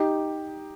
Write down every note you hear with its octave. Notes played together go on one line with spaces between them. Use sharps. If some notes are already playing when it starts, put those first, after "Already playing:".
Already playing: D#4 G4